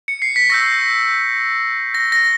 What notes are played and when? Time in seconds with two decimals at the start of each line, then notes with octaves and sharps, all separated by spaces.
0.08 C#7
0.22 C7
0.36 B6
0.49 C#6 E6 G6 A#6
1.95 A#6
2.12 A#6